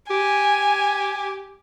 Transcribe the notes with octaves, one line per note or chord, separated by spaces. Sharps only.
G4 G#5